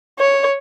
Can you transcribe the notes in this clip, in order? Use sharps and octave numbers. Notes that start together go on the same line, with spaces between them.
C#5